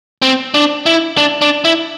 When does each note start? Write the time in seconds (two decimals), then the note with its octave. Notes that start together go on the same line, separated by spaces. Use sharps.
0.22 C4
0.54 D4
0.86 E4
1.17 D4
1.42 D4
1.65 E4